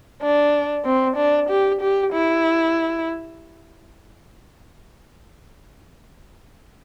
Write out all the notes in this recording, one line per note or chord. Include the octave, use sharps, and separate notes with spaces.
D4
C4
D4
G4
G4
E4